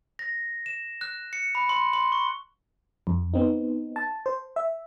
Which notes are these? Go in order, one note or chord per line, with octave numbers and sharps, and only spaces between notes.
A#6
E7
F#6
C#7
B5
C6
C6
C#6
F2
B3 C4 D#4
A5
C5
E5